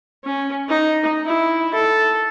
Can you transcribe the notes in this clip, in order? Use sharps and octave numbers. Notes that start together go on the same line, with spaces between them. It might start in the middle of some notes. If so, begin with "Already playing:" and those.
C#4
D#4
E4
A4